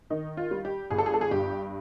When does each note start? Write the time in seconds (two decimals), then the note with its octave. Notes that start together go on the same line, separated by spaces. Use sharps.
0.10 D#3 D#4
0.37 F4
0.51 G3
0.65 G4
0.90 G1 G#4
0.98 A4
1.06 G#4
1.14 A4
1.21 G#4
1.31 G2 G4